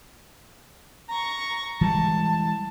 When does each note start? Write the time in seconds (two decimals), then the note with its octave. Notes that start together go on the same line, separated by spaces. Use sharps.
1.09 A#5 C#6
1.81 E3 G3 G#3 A5